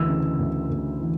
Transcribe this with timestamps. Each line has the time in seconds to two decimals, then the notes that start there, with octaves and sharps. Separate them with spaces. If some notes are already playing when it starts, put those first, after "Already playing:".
Already playing: D2 E3 E6
0.09 C#3
0.39 D2
0.70 D2
1.00 E3